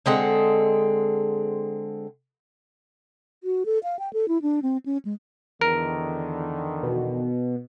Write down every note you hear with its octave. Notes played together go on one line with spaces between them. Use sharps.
D3 G#3 C4 F#5
F#4
A4
F5
G5
A4
E4
D4
C4
C#4
G#3
E2 D3 D#3 A#4
B2